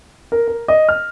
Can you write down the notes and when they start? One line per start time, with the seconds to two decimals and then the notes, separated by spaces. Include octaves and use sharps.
0.32 A#4
0.48 A#4
0.68 D#5
0.89 F6